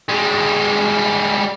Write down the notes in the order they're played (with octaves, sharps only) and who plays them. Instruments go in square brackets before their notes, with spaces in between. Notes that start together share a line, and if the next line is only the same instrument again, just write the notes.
[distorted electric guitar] G3 G#3